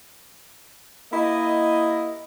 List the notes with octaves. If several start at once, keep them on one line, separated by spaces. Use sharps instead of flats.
A#3 E4 G4 D#5